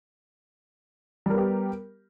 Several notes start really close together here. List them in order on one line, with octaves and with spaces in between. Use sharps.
G3 A#4 B3 G4